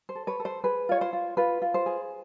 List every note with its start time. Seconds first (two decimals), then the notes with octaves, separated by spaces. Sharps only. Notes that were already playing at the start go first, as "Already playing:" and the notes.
0.09 C5
0.15 A4
0.27 B4 C#5
0.40 A4
0.45 C5
0.64 G#4 B4
0.89 F4 C#5
1.01 C5
1.13 F4
1.37 F4 B4
1.62 F4
1.74 C5
1.86 G#4